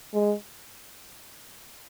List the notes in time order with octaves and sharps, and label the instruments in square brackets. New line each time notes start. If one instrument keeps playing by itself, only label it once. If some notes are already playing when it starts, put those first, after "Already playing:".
[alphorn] G#3